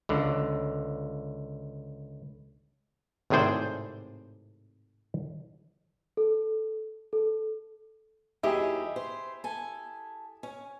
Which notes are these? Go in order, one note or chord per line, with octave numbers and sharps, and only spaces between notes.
C#2 D3
G#1 A2 C3 G#4 C5 D5
A4
A4
D#2 F#3 E4 G4 G#4 D#5
C5
A4 G#5
C#4